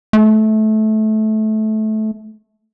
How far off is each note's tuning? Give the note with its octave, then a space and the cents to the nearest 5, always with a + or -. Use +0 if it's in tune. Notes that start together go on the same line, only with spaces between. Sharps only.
A3 -20